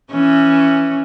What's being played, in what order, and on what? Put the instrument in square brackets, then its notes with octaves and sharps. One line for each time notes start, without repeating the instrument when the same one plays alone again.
[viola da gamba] E3 C#4